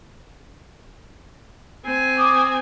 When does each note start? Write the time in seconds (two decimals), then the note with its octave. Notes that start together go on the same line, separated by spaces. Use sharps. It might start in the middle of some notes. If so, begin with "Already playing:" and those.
1.85 C4 G#5
2.16 D6 D#6